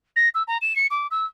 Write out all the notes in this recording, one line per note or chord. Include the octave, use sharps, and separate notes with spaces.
A#6
E6
A#5
E7
C#7
D6
E6